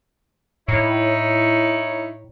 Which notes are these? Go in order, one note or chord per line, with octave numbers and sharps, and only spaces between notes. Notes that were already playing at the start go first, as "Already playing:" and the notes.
A2 D#4 E4 C#5